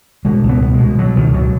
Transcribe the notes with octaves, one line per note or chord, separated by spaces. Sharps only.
B2 G#3
C#2
B3
B2
G#3
B2
B2 F#3
C#2 D#3
B2 F#3